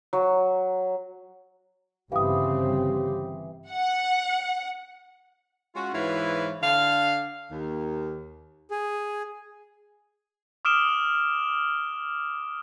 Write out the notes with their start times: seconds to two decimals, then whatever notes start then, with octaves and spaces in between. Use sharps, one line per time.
0.13 F#3
2.12 G1 C#3 E3 C4 G4 F5 D#6
3.71 F#5
5.75 G#3 C#4 F4 F#4
5.93 G#2 E3 E4 B4 C#5 F5
6.62 D3 F5
7.51 D#2
8.71 G#4
10.65 D6 D#6 F6 D7 E7 G7